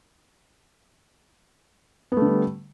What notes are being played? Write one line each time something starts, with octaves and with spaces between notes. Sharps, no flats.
D3 G3 A3 B3